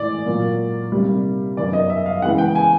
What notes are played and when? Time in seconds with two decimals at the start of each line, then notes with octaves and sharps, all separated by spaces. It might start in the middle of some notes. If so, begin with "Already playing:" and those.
Already playing: A2 E3 G#3 D5
0.26 A#2 F#3 A#3
0.92 C3 D#3 G3 A#3
1.57 F#2 D#3 F#3 B3 D5
1.73 D#5
1.90 E5
2.06 F5
2.22 C#3 E3 G#3 B3 F#5
2.38 G5
2.55 G#5